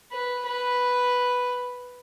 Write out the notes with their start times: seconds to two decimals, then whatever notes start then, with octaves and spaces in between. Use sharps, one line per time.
0.12 B4
0.46 B4